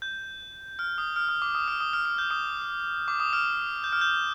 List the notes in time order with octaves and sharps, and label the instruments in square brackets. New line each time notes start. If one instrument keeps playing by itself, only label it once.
[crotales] G6
F6
D#6
F6
D#6
D6
D#6
F6
D#6
F6
F6
G6
D#6
D6
D#6
F6
G6
F6
G6